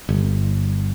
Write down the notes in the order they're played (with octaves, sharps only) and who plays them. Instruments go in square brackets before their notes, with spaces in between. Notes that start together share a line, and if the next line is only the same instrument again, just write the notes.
[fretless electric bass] G1